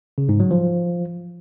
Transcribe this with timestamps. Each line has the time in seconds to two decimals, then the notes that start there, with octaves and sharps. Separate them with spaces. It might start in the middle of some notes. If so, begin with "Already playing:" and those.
0.18 C#3
0.29 G#2
0.40 F#3
0.51 F3